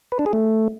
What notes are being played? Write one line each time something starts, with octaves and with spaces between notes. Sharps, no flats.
B4
D4
G#4
A3